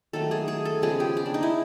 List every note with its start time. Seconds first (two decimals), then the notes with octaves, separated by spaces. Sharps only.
0.13 D#3 F#3 A3 A4
0.31 G#4
0.48 G#4
0.65 A4
0.82 C#3 F3 G#3 B3 G#4
1.00 G4
1.17 G#4
1.26 D4
1.34 D#4
1.43 E4